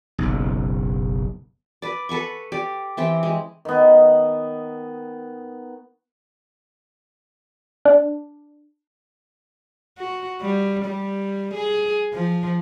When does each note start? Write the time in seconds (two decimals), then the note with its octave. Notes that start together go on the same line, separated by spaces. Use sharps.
0.18 F#1 B1
1.82 B4 D5
2.09 A4 B4 F#5 C#6
2.52 G4 D5
2.97 E3 C4 G4 G5
3.23 G#3
3.65 D#3 B3
7.85 D4
9.99 F#4
10.41 G3
10.85 G3
11.54 G#4
12.13 F3